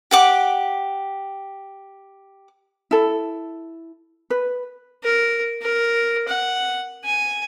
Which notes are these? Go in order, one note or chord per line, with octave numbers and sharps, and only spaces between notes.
G4 F#5 D6
E4 A4
B4
A#4
A#4
F#5
G#5